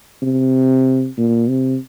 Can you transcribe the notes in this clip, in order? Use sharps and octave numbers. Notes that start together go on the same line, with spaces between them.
C3
A#2
C3